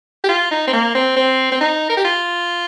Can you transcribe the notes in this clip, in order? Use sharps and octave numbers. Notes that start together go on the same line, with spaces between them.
G4
F4
D#4
C4
A#3
C4
C4
C4
D#4
A#4
G4
F4